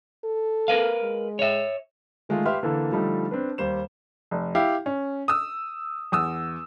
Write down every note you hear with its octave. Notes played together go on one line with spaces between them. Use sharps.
A4
A#4 B4 F5
G#3
C#5 E5
D#3 G#3 A3 F4
G4 B4 E5 F5 C6 F6
D3 E3 A#3 A4
D3 F3 G3 A3 D#4 A4
C4 D4 B4
D#2 G3 C5 E7
F1
E4 G4 F5
C#4
D#6 E6
E2 D#6 E6